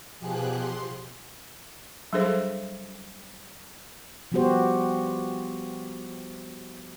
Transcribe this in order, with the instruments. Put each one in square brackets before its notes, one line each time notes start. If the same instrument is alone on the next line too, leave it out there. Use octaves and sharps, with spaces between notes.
[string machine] B2 F3 G4 G#4 F#6
C6
[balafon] F#3 G3 D4 G#4 A4 C5
[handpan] F3 G3 B3 F#4 G4 C5